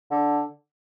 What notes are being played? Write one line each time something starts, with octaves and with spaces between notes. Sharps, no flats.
D3